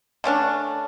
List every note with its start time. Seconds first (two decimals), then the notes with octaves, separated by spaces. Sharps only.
0.24 D3 A3 C#4 D4